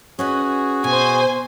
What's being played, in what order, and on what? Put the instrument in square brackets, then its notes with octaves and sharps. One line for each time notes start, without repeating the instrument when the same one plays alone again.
[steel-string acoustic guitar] C#4 B4 D#5 [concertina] F#4 G#4
[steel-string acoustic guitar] B2 [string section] C5 G#5